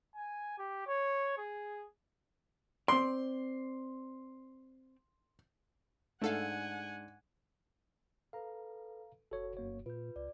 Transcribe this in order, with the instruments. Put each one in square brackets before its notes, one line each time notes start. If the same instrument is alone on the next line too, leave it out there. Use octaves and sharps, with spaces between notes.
[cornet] G#5
G4
C#5
G#4
[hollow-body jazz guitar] C4 D5 [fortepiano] C6
[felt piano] G#2 D4 [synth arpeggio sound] A3 A4 F5 [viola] F#5 G#5
[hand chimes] A4 B4 [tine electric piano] F5 A#5
[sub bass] F1 [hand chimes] F#4 [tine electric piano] A4 C#5
[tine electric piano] F#2 A#3 C#5
[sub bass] A#2 [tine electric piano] F4 [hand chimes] B4 G6
[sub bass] C#2 [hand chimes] D5